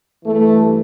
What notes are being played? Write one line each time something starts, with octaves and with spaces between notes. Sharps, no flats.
G2 E3 A3